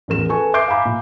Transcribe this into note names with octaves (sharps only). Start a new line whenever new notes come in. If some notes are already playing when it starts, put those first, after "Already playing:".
A1 E2 A#4 E7
A4 B4 G#5 C#6
E5 D6 G6 C7 D7
F5 G#5 A#5 B5 D6
A#2